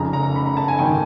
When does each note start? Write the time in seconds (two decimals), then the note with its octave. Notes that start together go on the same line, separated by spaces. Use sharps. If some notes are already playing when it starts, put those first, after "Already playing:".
Already playing: F1 F2 C#3 F3 A#5
0.13 A#5
0.36 B5
0.46 A#5
0.57 A5
0.68 G#5
0.79 G#1 G#2 D#3 G5